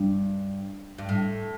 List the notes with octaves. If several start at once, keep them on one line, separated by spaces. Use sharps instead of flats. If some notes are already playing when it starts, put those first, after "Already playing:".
Already playing: G2
G2
A2